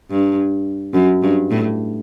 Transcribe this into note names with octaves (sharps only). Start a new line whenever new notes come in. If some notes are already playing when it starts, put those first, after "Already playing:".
G2
F#2
G2
A2